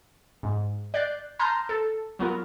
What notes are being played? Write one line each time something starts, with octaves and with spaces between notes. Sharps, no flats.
G#2
D5 F#6 G6 A6 C7
A5 A#5 C6 D#6 F6 G6
A4
F#3 B3 F4 A#4